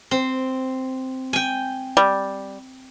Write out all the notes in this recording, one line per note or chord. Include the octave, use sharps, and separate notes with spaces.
C4
G5 G#5
G3